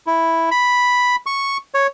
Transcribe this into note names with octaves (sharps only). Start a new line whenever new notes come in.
E4
B5
C#6
C#5